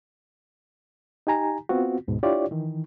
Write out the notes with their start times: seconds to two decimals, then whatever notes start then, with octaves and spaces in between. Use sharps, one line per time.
1.27 D#4 G4 G#5 A#5
1.69 B3 C4 F4 F#4
2.08 D2 G#2 B2
2.23 D4 E4 F4 G4 C#5 D5
2.51 D#3 E3